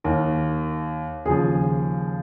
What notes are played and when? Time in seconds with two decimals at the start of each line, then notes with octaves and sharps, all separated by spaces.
0.04 D#2 D#3 A#4
1.25 D#2 C#3 F3 G#4